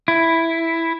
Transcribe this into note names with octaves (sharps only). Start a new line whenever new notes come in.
E4